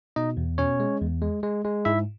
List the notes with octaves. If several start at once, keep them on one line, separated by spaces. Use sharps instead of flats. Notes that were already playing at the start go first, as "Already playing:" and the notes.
B2 D#4 D#5
E2
B2 C#4 C#5
G#3
E2
G#3
G#3
G#3
G#2 E4 E5